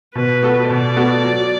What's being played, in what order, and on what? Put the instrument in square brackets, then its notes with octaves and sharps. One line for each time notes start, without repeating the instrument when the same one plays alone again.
[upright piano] B2 [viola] B4
[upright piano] B3 F#4 A4
[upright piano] B2 [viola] D5
[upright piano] B3 F#4 A4
F#3